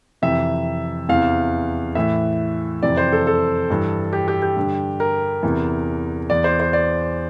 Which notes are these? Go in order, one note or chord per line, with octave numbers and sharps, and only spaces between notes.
F2 C3 E3 E5
E2 C3 E3 F5
A2 E3 E5
F2 C3 E3 D5
C5
A4
A4
G2 E3
G4
G4
G4
G2 D3
A#4
E2 C3 E3
E2 E3 D5
C5
C5
D5